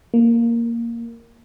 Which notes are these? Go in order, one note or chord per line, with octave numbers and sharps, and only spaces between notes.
A#3